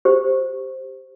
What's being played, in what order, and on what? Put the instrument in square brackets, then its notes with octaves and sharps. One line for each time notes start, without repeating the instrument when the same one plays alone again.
[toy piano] G4 C5